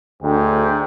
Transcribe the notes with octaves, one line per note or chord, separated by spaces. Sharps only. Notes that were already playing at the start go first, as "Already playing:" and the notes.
D2 G#2 G5